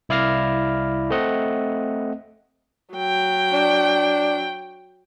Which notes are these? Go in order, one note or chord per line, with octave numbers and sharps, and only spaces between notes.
C2 E4 D5 F5 F6 A#6
A3 C4 D#5 F#5
F#3 G5
D4